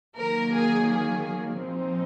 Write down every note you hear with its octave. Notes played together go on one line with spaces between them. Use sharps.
D#3 F#3 A#3 A#4
G#4
G#4
A#2 F3 C4 D#4